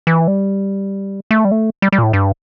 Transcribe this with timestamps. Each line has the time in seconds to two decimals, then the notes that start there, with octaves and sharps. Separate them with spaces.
0.07 E3
0.28 G3
1.31 A3
1.45 G3
1.51 A3
1.82 G3
1.92 G3
1.98 A#2
2.03 A2
2.13 G2